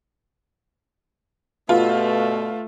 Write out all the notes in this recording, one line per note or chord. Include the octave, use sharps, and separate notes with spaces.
G2 B2 A3 F4